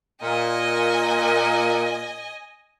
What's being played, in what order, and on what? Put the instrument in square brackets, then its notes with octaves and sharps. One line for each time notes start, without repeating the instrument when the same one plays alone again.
[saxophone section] A#2 [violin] D#5 G#5